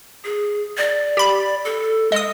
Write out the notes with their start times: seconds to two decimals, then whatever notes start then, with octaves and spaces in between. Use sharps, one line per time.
0.25 G#4
0.77 D5
1.17 G4 B5
1.65 A4
2.12 G#3 D#5 D#6